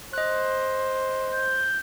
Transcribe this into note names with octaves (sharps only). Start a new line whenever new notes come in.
C5 D#5 F#6
G6